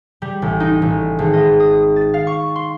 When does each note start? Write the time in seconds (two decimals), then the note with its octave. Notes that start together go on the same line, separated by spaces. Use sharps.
0.22 G3
0.42 A1
0.60 D#4
0.82 A1
1.19 G#1
1.33 D#5
1.60 D#6
1.96 A6
2.14 F5
2.27 C#6
2.56 C6